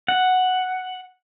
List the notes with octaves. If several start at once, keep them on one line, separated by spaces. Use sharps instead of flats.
F#5